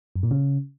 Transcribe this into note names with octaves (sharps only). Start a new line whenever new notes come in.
F#2
A#2
C#3